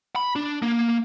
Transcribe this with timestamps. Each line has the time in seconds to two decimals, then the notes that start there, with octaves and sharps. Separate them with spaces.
0.16 B5
0.36 D4
0.62 A#3